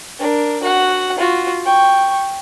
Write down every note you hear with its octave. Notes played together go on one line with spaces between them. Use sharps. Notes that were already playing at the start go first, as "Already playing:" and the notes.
D4 A#4
F#4 F#5
F4 F#4
G5 C#6